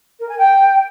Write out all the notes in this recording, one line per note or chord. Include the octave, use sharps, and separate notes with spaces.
A#4
G#5
G5